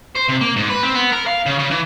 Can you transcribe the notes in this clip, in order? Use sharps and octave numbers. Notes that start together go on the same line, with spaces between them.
C5
C3
A#3
G#2
B4
C4
B3
A#4
F5
C#3
C#3
E3